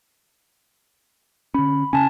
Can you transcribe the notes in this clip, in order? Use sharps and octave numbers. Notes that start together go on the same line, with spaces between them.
D3 C#4 B5
C#3 C#4 G#5 A5